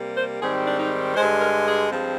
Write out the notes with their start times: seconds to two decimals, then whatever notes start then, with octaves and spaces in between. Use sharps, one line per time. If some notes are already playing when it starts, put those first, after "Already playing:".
Already playing: C3 G3 A#3
0.16 C5
0.41 G#2 D#3 G3 C4 G#4
0.67 D4
0.79 D#4
1.16 G2 D3 G#3 C5
1.41 A#4
1.66 G#4
1.91 G2 F3 G#3 C4